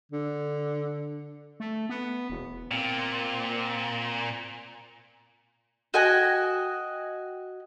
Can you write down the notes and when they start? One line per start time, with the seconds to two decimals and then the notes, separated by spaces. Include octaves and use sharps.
0.12 D3
1.60 A3
1.89 B3
2.30 E1
2.71 A#2 C4
5.94 F#4 D#5 G5 G#5